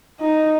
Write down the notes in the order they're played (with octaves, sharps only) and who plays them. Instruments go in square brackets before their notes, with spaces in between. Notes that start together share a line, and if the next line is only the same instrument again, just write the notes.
[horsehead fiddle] D#4